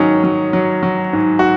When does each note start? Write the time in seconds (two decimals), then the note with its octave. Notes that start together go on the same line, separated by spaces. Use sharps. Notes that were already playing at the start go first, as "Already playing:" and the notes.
Already playing: G#2 D#3 F#3 C#4 D#4
0.24 F#3
0.53 F#3
0.83 F#3
1.13 G#2
1.39 F#4